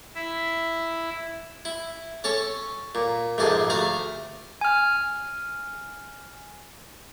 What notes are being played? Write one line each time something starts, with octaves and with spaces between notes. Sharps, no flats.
E4 E5
E4
C#4 A4 C#5 C#6
A#2
A#1 F2 G#2 C3 A4 G#5
D2 A3 F5 A#5
G#5 F6